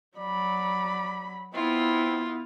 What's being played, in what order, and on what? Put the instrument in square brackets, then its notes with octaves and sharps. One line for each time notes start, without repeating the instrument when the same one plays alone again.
[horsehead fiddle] F#3 B5 [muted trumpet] D5
[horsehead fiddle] B3 E4 [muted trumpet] C4 [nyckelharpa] F4